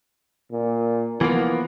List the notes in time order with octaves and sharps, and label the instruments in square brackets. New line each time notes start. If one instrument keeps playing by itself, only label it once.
[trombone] A#2
[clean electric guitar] E3 F3 A#3 [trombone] B3